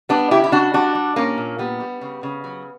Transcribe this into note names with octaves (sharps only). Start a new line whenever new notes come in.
G3 B3 D4
C#3 E4 G4
E4
C#3 D4 F#4
G3 D4 F#4
G3
A#2 A#3 C#4
A#2
G3 B3
G3
C#3
C#3
F#3